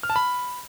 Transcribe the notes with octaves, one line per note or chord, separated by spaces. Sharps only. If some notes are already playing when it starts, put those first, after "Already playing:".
F6
A5
B5